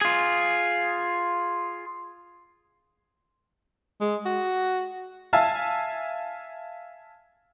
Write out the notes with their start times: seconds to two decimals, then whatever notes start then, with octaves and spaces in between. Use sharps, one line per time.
0.01 F4 G#4
4.01 G#3
4.25 F#4
5.33 E5 F5 G#5 A5